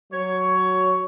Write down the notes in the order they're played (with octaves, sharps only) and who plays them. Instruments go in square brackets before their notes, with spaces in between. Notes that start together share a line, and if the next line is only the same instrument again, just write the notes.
[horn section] F#3 C#5